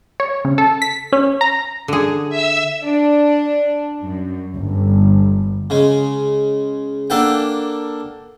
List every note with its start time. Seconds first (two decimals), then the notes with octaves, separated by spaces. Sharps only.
0.20 C#5
0.45 C#3
0.58 A4
0.82 B6
1.12 C#4
1.41 A#5
1.88 D3 G#4
2.29 E5 E6
2.83 D4
4.02 F#2
4.55 G1
5.70 C#3 G#3
7.10 A#3 D4 A4 F#5 G5